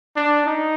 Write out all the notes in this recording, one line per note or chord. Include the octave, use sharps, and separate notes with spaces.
D4
D#4